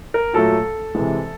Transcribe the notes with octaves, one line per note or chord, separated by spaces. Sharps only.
A#4
A#2 F#3 A3 A4
C3 E3 G#3